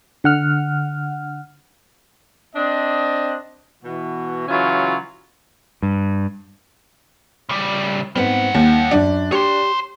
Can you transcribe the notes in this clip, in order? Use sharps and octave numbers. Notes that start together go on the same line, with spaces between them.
D3 F#5 F6
C4 D4 D#5
B2 E3 F#4
C#3 E3 F#3 C#4 E4 F4
G2
C#3 G3
G#2 G3 B3 C4 F#5
D#2 D#3
F#2 D4
G4 C#5 C6